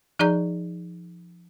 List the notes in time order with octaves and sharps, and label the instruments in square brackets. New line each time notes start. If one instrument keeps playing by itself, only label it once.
[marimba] F3 D#4 G#4 D5 A#5 G6